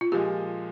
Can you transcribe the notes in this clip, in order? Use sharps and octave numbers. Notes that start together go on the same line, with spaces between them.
F4
A#2 F3 G#3 G4